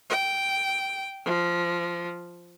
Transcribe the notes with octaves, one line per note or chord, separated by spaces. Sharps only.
G5
F3